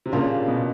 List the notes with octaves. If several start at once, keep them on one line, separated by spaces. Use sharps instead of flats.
C3
A#2 C#3 G3 A#3 D4 F4
B2